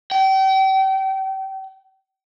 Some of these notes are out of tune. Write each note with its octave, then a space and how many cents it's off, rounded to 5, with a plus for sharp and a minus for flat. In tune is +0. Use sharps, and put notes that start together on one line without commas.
G5 -35